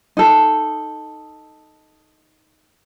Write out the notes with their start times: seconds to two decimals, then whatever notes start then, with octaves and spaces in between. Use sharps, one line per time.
0.17 D#4 A4